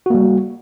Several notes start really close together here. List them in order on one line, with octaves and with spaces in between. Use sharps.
F#4 A#3 G3